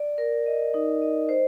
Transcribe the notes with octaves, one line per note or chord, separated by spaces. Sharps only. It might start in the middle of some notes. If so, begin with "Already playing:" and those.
Already playing: D5
A#4
D#5
D#4
D#5
C5